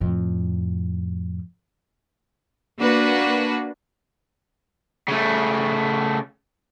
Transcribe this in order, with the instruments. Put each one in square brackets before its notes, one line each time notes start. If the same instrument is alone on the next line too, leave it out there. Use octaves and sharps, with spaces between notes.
[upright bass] F2 A2
[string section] A#3 D4 F#4 B4
[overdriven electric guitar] C#3 A3